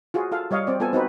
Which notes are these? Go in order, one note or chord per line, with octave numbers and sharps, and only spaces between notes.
F4 F#4 G#4
F4 A4 F5
G3 C#5 D#5 F5
C4 D5
B3 F4 A4 G#5
C4 D#4 F#4 B4